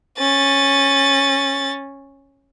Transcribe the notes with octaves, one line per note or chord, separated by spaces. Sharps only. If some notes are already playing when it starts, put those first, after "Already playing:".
C#4 A6